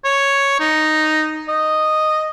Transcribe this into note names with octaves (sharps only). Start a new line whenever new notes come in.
C#5
D#4
D#5